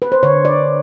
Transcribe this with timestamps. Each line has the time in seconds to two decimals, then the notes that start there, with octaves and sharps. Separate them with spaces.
0.02 B4
0.12 C5
0.23 D3 C#5
0.45 D5